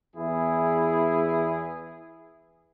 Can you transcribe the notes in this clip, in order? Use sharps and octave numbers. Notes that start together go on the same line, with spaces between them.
E2 E4 G#4